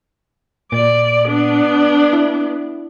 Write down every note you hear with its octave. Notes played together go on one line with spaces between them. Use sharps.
A#2 D5
B3 D4
E4